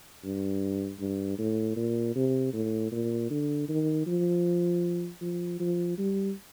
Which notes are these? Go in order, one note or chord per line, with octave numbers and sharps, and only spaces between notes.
G2
G2
A2
A#2
C3
A2
A#2
D3
D#3
F3
F3
F3
G3